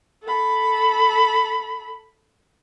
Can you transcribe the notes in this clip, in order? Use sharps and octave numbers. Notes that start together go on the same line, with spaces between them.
A4 B5